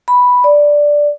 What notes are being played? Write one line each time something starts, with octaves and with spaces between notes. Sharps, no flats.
B5
D5